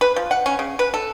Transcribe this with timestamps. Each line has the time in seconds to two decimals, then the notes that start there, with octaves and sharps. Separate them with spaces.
0.01 B4
0.16 F3
0.31 F#5
0.46 C#4
0.59 C#3
0.79 B4
0.94 A4